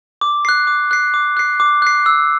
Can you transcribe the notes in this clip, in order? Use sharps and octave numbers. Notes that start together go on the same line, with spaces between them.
D6
F#6 C7
D6
F#6 C7
D6
F#6 C7
D6
F#6 C7
E6